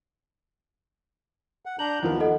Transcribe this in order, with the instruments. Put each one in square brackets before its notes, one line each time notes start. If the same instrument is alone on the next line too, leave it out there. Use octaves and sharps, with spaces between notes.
[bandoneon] F#5
[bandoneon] D4 A#5 G6 [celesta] F#7
[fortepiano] D#2 F3 A#4 [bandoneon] B3
[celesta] A4 D#5 F#5